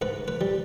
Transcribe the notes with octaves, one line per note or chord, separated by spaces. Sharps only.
G#2 B4
B4
G3